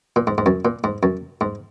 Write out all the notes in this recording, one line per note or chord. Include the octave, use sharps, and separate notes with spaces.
A#2
G#2
G#2
F#2
A#2
G#2
F#2
G#2